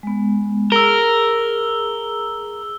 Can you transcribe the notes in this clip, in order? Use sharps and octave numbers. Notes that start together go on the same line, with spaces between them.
G#3 B3
G#4 A#4 E6 G7